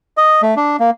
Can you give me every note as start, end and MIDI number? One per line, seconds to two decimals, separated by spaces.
0.17 0.42 75
0.42 0.55 57
0.57 0.76 62
0.80 0.90 58